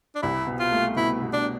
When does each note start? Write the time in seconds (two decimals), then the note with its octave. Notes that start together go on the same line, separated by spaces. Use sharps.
0.16 D4
0.23 C2 E4
0.47 B2
0.60 F4
0.72 A3
0.96 B2 E4
1.22 B2
1.33 D4